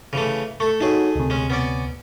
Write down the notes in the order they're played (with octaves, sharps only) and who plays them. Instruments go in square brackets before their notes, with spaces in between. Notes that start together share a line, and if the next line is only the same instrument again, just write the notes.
[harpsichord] C#3 E3 A3
[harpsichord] A3 A4 [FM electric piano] C#6
[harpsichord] A3 G#4 [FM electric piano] D#4 F#4 C#5
[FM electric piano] D2 C3
[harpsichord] G#3 C#4
B3 C#4 D5